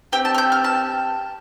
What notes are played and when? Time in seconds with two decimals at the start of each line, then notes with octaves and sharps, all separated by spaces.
0.12 C4 G4 G5
0.25 A5
0.34 F6
0.38 G6
0.52 F6
0.64 A5